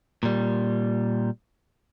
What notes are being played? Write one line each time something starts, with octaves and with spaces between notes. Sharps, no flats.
A#2 G3